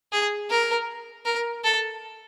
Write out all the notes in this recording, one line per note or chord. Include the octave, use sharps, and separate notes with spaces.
G#4
A#4
A#4
A4